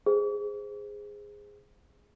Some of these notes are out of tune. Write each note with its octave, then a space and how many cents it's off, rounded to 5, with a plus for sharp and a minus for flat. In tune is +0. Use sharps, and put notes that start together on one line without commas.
G#4 -10 C5 -10